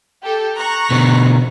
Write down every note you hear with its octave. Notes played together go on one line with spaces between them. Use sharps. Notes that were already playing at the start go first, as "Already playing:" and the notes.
G4 A4
A#5 C#6 F#6
B2 D3